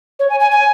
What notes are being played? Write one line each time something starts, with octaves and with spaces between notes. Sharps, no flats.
C#5
G#5
G#5
G#5